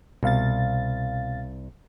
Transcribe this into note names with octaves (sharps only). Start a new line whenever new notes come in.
C2 B2 F5 A6